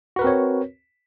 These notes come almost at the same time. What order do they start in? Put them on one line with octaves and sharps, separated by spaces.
F#4 B4 A#4 C4 C#5